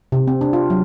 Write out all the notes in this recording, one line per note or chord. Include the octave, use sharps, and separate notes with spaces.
C3
C4
D4
F4
F#3